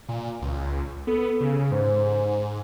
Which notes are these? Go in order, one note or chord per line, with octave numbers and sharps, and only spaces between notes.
A#2
C#2
B3 A4
C#3
G#2 C5